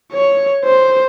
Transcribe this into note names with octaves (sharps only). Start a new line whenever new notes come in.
C#5
C5